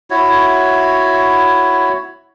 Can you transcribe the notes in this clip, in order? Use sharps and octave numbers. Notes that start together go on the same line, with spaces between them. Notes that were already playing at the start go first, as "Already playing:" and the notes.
E4 F#4 C#5